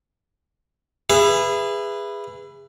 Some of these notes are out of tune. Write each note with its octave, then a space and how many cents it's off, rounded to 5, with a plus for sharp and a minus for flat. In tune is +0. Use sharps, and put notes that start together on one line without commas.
G#4 -20 B4 +0 E5 +25